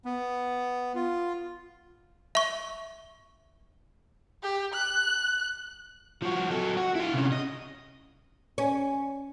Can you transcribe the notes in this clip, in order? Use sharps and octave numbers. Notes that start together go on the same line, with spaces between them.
B3
F4
E5 C#6
G4
F#6
F3 F#4
F#3 A4
F#4
E4 F5
C3 C#4
D#5
C#4